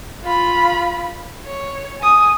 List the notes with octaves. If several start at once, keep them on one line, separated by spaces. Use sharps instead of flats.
F4 B5
C#5
G#5 D#6